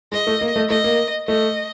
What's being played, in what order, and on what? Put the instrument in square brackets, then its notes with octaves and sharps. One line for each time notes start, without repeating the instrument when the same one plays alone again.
[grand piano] G#3 [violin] D#5
[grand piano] A3
A#3
A3
[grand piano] A3 [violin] D#5
[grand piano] A#3
[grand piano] A3 [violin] D#5